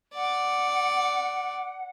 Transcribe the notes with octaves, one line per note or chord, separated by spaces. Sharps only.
D5 F#5